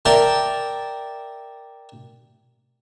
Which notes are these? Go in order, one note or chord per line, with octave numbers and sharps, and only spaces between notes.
A#4 D5 E5 G5 A5 A#5